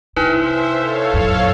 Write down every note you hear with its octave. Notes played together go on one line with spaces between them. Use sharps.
C3 D#4 E4 B4 C5 E5
A4 C#5 F5
F#2 A#2